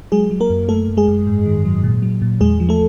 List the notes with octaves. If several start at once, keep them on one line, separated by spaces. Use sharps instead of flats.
F#3 G#3 G#4
F#3
A#3 A#4
F#2
F#2 A3 A4
F#2
G#3 G#4
F#2
G#2
D#3
F#3
A#2
F#3
A#2
E2 G#3 G#4
F3
A3 A4